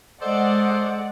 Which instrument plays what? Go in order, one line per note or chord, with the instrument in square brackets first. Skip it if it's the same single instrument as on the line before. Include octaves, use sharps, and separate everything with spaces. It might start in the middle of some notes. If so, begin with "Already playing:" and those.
[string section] G#3 D5 F#5 [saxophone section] A4 C5 [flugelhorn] D#5